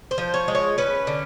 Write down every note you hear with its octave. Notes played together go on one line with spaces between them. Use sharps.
C5
F3
C#5
G#3
C#5
C#4 B4
D3